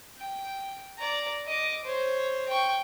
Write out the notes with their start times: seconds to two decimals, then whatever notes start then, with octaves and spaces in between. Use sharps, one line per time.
0.17 G5
0.98 D5 A#5
1.47 D#5 D6
1.85 C5 C#5
2.49 G5 C#6